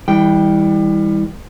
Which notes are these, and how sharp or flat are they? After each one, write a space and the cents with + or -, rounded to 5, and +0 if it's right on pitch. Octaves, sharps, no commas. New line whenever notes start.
E3 -25 G3 +25 G5 +0